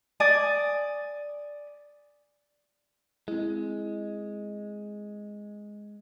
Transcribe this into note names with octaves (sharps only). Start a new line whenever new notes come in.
D5 G#5 D#6
G#3 C4 E4